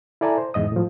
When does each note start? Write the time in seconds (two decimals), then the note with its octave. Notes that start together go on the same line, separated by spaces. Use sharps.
0.21 E4 A4 D5 G#5 A#5
0.38 C5
0.54 E2 G#2 D#5 D#6
0.72 A2 F3